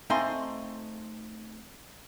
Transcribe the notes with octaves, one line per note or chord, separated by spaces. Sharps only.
A3 C4 D#4 F5 G#5 C6